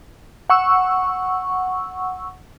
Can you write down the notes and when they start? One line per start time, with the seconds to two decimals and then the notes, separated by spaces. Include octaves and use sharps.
0.50 F#5 C#6 E6